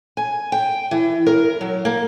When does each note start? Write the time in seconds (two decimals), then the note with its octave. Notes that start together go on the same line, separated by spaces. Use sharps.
0.17 G#5
0.52 G5
0.91 E3
1.26 A#4
1.61 F#3
1.85 A#3